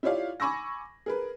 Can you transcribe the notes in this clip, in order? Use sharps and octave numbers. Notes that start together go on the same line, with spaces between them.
E4 F4 G4 C#5 D5 F5
G#5 B5 C#6 D6 E6 A#6
G#4 A#4 B4